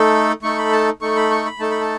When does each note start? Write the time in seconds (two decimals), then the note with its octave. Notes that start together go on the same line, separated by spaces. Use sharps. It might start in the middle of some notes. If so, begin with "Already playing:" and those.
Already playing: A3 D#4 A4
0.43 A3 D#4 A4 C#6
0.58 B5
0.72 A5
1.01 A3 D#4 A4 C#6
1.16 B5
1.31 C#6
1.46 B5
1.59 A3 D#4 A4 A5
1.71 B5
1.81 A5